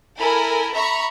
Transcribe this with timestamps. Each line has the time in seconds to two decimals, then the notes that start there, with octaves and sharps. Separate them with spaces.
0.20 E4 A4 A#4 G#5
0.74 E5 A#5 B5 C#6